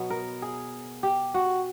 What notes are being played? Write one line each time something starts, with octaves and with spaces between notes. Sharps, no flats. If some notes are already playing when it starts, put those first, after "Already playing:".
Already playing: B2 F#3 B3
A#4
G#4
G4
F#4